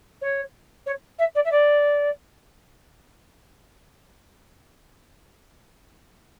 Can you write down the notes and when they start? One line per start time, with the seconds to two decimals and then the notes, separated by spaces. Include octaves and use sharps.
0.21 C#5
0.86 C#5
1.19 E5
1.35 D5
1.45 E5
1.51 D5